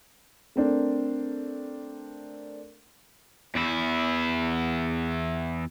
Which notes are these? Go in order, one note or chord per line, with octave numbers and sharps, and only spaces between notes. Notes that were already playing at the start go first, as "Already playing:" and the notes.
A3 C4 D4 A#4
E2 E4